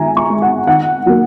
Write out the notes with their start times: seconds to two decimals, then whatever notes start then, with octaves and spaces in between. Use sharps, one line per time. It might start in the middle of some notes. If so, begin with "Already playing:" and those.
Already playing: D#3 G#3 E5 G#5 A#5
0.17 C#6
0.30 G#3
0.42 F#5
0.67 D#3 F#5
1.06 F#3 A#3